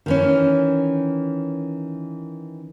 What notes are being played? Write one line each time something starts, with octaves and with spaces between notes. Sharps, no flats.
D#3 E3 C#4